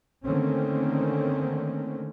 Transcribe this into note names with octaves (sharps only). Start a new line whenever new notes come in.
D3 D#3 A3 A#3 C4 C#4